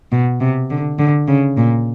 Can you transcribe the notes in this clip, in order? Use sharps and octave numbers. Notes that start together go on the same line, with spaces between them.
B2
C3
D3
D3
C#3
A#2